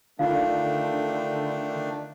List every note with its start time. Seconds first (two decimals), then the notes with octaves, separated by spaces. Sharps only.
0.19 D3 D#3 A3 D4 D#4 F4 F5